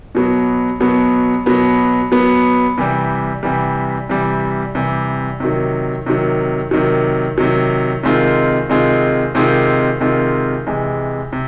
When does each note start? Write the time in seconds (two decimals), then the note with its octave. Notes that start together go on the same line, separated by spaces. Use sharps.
0.15 B2 F#3 B3
0.80 B2 F#3 B3
1.46 B2 F#3 B3
2.12 B2 F#3 B3
2.78 C3 E3 G3
3.43 C3 E3 G3
4.09 C3 E3 G3
4.75 C3 E3 G3
5.40 C3 D#3 F#3
6.06 C3 D#3 F#3
6.71 C3 D#3 F#3
7.38 C3 D#3 F#3
8.03 C3 D#3 G#3 C4 F4
8.69 C3 D#3 G#3 C4 F4
9.35 C3 D#3 G#3 C4 F4
10.01 C3 D#3 G#3 C4 F4
10.67 C3 E3 G#3
11.33 C3